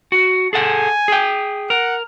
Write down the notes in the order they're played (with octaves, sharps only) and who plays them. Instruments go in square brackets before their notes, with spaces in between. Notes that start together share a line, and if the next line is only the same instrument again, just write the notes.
[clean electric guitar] F#4
[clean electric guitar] G#4 A4 F#5 [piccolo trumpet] G#5
[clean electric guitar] G#4 G5
[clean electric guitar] A#4 [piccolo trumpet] F#5